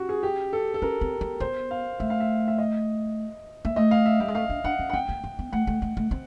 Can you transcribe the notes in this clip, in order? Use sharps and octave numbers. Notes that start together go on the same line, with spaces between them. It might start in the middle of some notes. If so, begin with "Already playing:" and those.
Already playing: C#4 F#4 G4
G#4
G4
A4
A4
C#4 A#4
C4
B3
B3 C5
F5
A3 E5
F5
E5
E5
D#5
A#3 E5
A3 D#5
F5
E5
G3 F5
G#3
A3 F5
D4
D4 F#5
C#4
F#5
C4 G5
A#3
B3
B3
A3 F#5
A3
A3
A3
C4